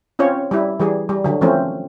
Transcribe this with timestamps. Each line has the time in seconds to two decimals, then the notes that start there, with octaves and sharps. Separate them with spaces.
0.19 C4 C#4 F4 C#5
0.51 G3 E4
0.80 E3 G3 G#4
1.09 G3
1.24 D3 F#3
1.41 E3 F3 A3 C4 C#4